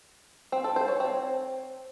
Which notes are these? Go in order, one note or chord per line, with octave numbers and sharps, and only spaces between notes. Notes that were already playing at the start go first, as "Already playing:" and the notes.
C4
A4
C5
C#5
C4